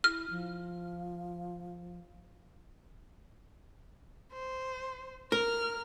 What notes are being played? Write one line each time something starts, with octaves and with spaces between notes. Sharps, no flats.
E4 F6
F3
C5
A#4 F6